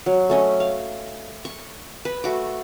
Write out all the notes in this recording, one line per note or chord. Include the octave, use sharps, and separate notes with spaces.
F#3
A3 C#4 D#5
F5
C#6
B4
A3 F#4 D6